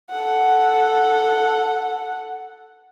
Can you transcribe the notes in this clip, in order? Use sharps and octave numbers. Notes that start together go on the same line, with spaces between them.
A4 F#5